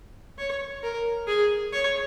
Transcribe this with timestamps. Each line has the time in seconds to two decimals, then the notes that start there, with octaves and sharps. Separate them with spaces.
0.38 C#5
0.83 A#4
1.27 G#4
1.73 C#5